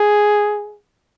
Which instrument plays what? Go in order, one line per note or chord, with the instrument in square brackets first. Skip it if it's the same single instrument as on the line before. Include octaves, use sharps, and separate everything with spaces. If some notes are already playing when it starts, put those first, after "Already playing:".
Already playing: [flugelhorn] G#4